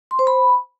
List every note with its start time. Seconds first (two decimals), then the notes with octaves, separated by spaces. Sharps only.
0.11 C6
0.19 C5
0.27 B5